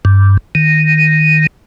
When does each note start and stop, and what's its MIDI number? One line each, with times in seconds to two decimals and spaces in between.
0.05 0.37 43
0.55 1.47 51